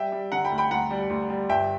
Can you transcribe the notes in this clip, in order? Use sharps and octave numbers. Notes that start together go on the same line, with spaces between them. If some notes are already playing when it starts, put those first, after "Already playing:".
Already playing: G3 E5 G5
G3
D3 F#5 A#5
G5 B5
D2
G5 B5
D2 F#5 A#5
G3
D2
G3
G1 E5 G5